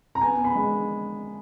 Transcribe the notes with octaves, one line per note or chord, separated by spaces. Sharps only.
A#5
B3 G#5
B5
G#3